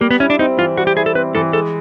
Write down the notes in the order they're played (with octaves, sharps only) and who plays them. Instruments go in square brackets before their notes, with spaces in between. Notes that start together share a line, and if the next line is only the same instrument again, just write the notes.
[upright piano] G3 [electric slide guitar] A#3
[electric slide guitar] B3
[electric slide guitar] C#4 [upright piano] E4
[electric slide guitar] D4
[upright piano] C4 [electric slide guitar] D#4
[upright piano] E3 [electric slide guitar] F4
[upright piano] G3 [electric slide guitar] F#4
[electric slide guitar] G4
[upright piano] E4 [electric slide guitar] G#4
[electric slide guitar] A4
[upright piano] C4 [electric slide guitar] B4
[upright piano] E3 [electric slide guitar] A4
[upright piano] G#3 [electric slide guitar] A4